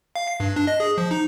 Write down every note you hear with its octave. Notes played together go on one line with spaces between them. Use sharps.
F5
C7
G2
D4
D#5
G#4
F3
D#4